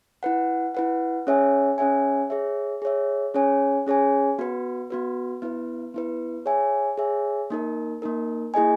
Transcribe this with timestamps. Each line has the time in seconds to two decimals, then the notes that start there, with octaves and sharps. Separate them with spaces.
0.23 E4 B4 F#5
0.75 E4 B4 F#5
1.27 C#4 G#4 C#5 E5 G#5
1.78 C#4 G#4 C#5 E5 G#5
2.30 G#4 C#5 E5
2.82 G#4 C#5 E5
3.34 C#4 G#4 C#5 G#5
3.87 C#4 G#4 C#5 G#5
4.39 B3 F#4 B4
4.90 B3 F#4 B4
5.42 B3 E4 B4
5.94 B3 E4 B4
6.46 G#4 C#5 E5 G#5
6.98 G#4 C#5 E5 G#5
7.50 A#3 D#4 A#4
8.02 A#3 D#4 A#4
8.54 A#3 E4 G#4 D#5 G#5